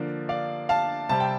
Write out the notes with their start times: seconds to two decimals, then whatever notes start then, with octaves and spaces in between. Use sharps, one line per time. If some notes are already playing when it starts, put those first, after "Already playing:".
Already playing: D3 F3 A#3 D4
0.29 D5 F5
0.69 F5 A5
1.09 C3 G3 C4 A5
1.20 G5